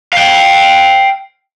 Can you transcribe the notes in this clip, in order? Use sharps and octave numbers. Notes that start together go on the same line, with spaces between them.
F5 G5